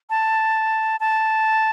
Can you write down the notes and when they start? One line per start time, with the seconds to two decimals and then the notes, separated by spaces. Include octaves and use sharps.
0.10 A5
1.00 A5